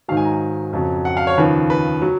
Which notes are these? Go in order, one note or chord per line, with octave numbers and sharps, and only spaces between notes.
G#2 D#3 F#3 F5
G#5
A#5
G#5
F2 C#3 F#3
F#5
F5
C#5
D#2 C#3 F3 B4
B4
F#3